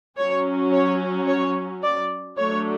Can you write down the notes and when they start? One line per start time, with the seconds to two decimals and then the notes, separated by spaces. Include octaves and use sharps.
0.17 F#3 C#4 C#5
0.72 C#5
1.28 C#5
1.82 D5
2.37 F#3 A3 D4 C#5